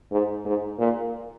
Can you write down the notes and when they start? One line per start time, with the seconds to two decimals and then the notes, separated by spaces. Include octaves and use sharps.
0.12 G#2
0.45 G#2
0.79 A#2